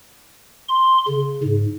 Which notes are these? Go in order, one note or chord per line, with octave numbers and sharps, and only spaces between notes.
C6
C#3
G#2